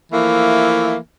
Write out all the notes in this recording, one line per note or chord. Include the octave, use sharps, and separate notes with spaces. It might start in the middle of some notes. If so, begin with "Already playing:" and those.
E3 F3 A3 A#3